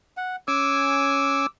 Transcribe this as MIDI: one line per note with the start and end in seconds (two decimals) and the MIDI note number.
0.17 0.36 78
0.48 1.47 61
0.48 1.47 80
0.48 1.46 86
0.48 1.46 88